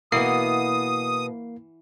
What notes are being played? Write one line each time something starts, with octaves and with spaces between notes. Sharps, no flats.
B2 E3 A#3 B3 F#4 D#6 C7